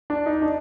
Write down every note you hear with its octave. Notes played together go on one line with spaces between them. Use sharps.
D4
D#4
D4